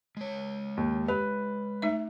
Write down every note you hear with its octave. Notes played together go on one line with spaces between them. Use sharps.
G#3 C#5
D#2
G4 B4
A3 D#4 E5